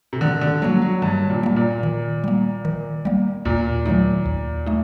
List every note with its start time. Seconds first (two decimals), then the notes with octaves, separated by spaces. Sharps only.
0.13 C3
0.21 D3 D#3
0.41 D3
0.62 F#3 G3 A#3
0.82 F#3
1.02 G2 D#3
1.30 A#2
1.43 G3 A#3
1.56 A#2
1.83 D#3
2.24 G3 A#3
2.65 D#3
3.05 G3 A#3
3.45 D#2 A#2
3.86 D#3 F#3 A3 D#4
4.26 D#2
4.66 A3 D#4